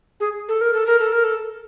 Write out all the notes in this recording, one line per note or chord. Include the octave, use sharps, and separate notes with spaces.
G#4
A4
A#4
A4
A#4
A4
A#4
A4